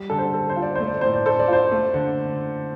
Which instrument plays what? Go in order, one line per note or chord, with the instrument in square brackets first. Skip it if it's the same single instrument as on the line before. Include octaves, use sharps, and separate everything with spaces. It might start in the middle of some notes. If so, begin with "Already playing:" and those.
Already playing: [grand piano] G3
[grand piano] D3 [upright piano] A4
[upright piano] C5
[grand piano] A4
[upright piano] C5
[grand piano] F4
[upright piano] D5
[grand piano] A3 [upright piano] C5
[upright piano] D5
[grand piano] A2 [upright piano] C5
[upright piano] D5
[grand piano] A4 [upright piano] C5
[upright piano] D5
[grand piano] F4 [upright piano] C5
[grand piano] A3
D3